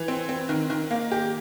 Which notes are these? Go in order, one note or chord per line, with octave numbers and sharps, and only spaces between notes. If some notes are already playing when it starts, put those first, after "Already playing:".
Already playing: E3
C4
C4
D#3
D#3
A#3
G4